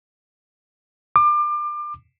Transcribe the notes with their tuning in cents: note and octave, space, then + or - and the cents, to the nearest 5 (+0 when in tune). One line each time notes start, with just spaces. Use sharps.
D6 +30